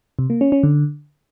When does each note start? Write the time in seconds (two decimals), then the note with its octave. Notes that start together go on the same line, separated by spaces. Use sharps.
0.19 C3
0.30 A#3
0.41 C#4
0.52 C#4
0.63 D3